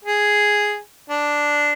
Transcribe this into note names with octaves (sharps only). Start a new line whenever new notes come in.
G#4
D4